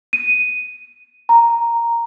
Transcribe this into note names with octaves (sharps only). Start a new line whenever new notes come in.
D#7
A#5